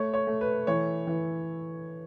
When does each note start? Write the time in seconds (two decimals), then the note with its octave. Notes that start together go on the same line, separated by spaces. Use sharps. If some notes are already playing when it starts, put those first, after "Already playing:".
Already playing: A3 C#5
0.14 C#5
0.27 A3
0.41 B4
0.67 E3 C#5
1.07 E3